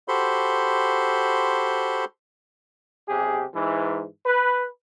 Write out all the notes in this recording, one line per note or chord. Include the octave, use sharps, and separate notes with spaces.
F#4 G4 A4 C5 B5 C6
B1 C3 G4 G#4
G#2 E3
B4